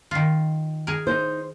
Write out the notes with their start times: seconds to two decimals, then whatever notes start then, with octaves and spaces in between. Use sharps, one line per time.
0.11 D#3 F4
0.87 G#4 A#4
1.07 D#4 C5